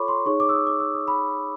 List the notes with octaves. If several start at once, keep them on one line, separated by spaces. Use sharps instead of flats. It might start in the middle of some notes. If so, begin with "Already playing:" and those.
Already playing: F4 A4 C#5 B5 C#6 D6
C6
D#4 G#4 C#5 C#6
D6
E6
D#6
D6
E6
D#6
B5